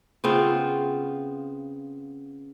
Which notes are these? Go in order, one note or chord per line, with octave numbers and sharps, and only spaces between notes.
C#3 B3 C4 F4